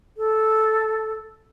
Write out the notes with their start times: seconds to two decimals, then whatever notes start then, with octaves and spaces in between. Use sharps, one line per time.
0.17 A4